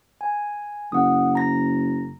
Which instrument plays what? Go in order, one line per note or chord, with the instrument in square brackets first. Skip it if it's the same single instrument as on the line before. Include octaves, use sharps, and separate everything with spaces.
[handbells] G#5
[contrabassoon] F#1 [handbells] F#5 D#6
[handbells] A#5 A#6